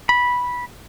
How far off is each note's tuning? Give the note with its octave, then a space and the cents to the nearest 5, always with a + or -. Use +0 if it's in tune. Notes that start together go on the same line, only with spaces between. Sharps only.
B5 -10